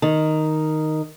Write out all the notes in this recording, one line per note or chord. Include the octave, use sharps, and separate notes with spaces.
D#3